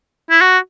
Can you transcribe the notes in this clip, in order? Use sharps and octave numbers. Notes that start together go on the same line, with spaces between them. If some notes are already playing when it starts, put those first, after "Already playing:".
E4
F#4